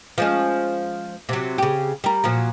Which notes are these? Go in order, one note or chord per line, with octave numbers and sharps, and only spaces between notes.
F3 G#3 C#4
C3 F#3
C#3 G4
G3 A#4
A#2 F3 F#3